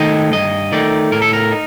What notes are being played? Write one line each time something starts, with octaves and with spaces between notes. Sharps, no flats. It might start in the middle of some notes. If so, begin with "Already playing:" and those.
Already playing: D#3 A3 D#4 D#5
G2 D#5
D#3 A3 D#4 D5
A2 A#4
A4
A#4
D#4